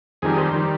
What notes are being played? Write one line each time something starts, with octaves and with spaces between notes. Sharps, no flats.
F2 D#3 G3 G#4
C5
D#3 G3